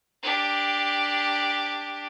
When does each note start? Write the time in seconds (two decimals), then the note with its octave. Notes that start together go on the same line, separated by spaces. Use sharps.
0.23 D4 G4